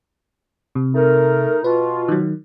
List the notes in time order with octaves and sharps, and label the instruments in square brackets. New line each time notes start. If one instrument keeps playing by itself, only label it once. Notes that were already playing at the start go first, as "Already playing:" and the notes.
[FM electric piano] C3
[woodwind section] A3 D#4 A#4
[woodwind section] B2 F4 [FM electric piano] B4
[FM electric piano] D#3 F#3